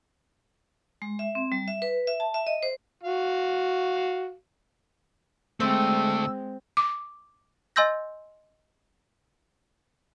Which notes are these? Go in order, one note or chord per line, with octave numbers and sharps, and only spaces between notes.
G#3
E5
C4
G3
E5
B4
E5
A5
E5
D#5
C5
F#4 F5
D2 G#3 A3 C4 E6
D6
D#5 G#5 C6 E6 G6 A#6